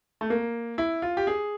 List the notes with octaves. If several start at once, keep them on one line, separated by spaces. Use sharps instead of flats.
A3
A#3
E4
F4
G4
G#4